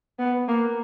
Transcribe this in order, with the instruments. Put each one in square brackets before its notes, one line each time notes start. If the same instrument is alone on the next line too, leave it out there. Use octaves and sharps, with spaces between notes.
[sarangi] B3
A#3